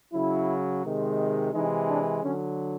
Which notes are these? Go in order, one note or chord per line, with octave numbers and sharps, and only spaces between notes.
C#3 F#3 E4
C3 D#3 G#3
C3 E3 G#3 D#4
D4
D3 F#3 C#4